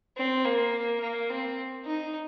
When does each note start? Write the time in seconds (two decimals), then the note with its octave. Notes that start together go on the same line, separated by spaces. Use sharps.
0.17 C4
0.44 A#3
1.00 A#3
1.30 C4
1.85 D#4